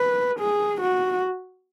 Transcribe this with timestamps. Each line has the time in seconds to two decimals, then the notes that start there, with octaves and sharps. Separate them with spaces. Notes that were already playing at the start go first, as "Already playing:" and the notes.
Already playing: B4
0.39 G#4
0.81 F#4